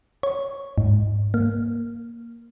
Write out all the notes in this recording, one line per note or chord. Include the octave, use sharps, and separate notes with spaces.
C#5
G#2
A#3